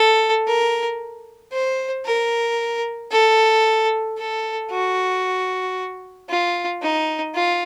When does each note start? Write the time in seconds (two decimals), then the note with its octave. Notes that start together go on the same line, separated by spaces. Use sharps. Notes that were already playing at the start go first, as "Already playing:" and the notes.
Already playing: A4
0.47 A#4
1.53 C5
2.06 A#4
3.12 A4
4.17 A4
4.71 F#4
6.30 F4
6.82 D#4
7.35 F4